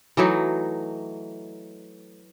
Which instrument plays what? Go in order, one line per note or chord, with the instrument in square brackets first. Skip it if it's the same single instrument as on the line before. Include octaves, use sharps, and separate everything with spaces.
[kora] E3 F#3 A3 D#4